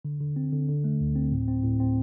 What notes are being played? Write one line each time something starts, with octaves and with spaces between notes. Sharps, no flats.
D3
D3
C4
D3
D3
A3
D2
C4
A2
C4
A2
C4